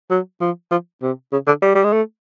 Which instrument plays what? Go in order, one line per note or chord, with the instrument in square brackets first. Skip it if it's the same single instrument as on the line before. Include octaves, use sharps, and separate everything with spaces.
[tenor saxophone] F#3
F3
F3
C3
C#3
D3
G3
G3
G#3
A3